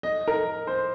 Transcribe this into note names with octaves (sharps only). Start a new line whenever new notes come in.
D#5
A#4
C5